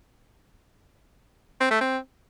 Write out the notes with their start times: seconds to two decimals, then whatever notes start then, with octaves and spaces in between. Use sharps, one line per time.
1.60 C4
1.71 A3
1.81 C4